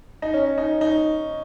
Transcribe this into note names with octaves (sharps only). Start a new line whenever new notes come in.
D#4
C#4
D#4
D#4